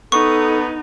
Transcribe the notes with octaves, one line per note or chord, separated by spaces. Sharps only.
B3 D#4 A4 C#6